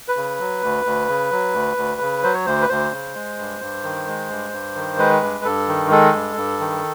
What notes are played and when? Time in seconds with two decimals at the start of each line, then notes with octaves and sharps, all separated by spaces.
0.08 B4
0.17 C#3
0.40 F#3
0.63 D2
0.85 D2
1.08 C#3
1.31 F#3
1.54 D2
1.77 D2
2.01 C#3
2.23 F#3 C5
2.34 C#5
2.46 D2 C5
2.62 B4
2.69 D2 C5
2.92 C#3
3.15 G#3
3.38 G2
3.61 G2
3.83 D#3
4.07 G#3
4.30 G2
4.53 G2
4.76 D#3
4.99 G#3 B4
5.22 G2
5.45 G2 A4
5.68 D#3
5.91 G#3 A4
6.14 G2
6.36 G2
6.60 D#3